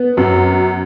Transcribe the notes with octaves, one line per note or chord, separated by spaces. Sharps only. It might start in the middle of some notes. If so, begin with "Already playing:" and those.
Already playing: B3
F#2